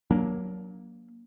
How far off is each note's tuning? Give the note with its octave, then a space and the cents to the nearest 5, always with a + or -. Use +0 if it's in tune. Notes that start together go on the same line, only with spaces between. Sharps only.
F#3 +0 A#3 +15 D4 -25